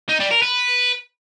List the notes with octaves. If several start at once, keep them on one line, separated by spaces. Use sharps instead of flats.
D#4
G3
A#4
B4